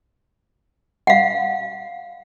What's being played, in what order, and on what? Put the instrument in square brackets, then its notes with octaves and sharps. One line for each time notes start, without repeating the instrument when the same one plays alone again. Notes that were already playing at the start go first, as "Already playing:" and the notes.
[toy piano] F5 F#5